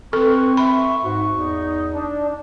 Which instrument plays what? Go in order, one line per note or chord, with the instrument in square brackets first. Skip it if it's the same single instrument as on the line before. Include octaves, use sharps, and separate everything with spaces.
[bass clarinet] C4 [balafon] A4 [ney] B4 [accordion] C#6
[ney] E5 [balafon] B5
[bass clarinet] G#2 [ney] F#4
[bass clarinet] E2 [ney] D#4
[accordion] D4